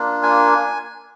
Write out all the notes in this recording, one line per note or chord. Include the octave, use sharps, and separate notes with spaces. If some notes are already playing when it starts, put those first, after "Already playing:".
Already playing: A#3 D4 F4
G#5